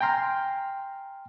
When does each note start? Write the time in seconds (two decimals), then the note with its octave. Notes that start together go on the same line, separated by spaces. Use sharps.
0.01 G5 G#5 A#5 C6 F6